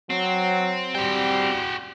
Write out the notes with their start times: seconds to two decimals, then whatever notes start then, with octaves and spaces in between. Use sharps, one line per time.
0.10 F#3 C4
0.95 G3 F#4 G5